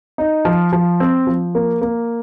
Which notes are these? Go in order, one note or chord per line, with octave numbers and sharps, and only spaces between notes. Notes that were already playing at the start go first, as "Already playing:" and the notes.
D#4
F3
F3
C4
F3
A#3
A#3